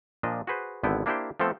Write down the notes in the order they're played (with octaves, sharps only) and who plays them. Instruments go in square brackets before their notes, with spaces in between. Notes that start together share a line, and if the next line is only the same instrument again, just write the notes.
[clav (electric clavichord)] A#2 F3 D4 D#5
F#4 G#4 B4 C5
G#1 D3 B3 E4 G5
A#3 D4 E4 G4 C5 G5
F3 A3 B3 C4 A4